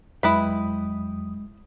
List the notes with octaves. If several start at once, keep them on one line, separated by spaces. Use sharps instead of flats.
F2 F#3 G#3 E4 B4 G5 B5 D#6